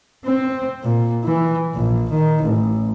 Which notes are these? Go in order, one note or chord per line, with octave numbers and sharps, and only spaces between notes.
C4
A#2
E3
A#1
D#3
A1